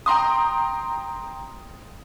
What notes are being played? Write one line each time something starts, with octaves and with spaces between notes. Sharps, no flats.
G5 A#5 C6 D#6